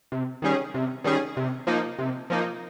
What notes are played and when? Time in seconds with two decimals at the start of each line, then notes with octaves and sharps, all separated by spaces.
0.12 C3
0.42 D#3 G3 C#4 G#4
0.74 C3
1.04 D#3 G3 C#4 G#4
1.37 C3
1.67 F3 A#3 D#4
1.99 C3
2.30 F3 A#3 D#4